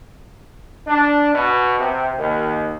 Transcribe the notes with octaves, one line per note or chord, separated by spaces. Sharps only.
D4
B2
C3
D#2